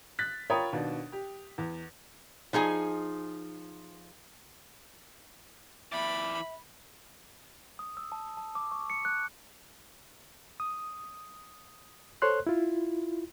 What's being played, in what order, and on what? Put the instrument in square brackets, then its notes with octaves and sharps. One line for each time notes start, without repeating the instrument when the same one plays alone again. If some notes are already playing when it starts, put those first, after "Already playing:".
[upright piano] F#6 A6 B6
F4 A#4 C#5 G5 B5 D#6
D#2 B2 D4
G4
E2
[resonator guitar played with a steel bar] F3 D#4 G#4 G#5
[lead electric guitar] E3 D5 [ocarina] E5 [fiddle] B5
[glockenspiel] D#6
E6
A5
A5
D6
C#6
C#7
F#6
[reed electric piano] D#6
A4 C5 C#5 C6 F#6
E4 F4